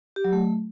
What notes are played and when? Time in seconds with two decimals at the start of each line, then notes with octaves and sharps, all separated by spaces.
0.16 G4
0.24 F#3
0.33 A3